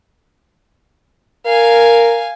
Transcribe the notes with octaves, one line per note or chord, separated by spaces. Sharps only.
A#4 F5 G#5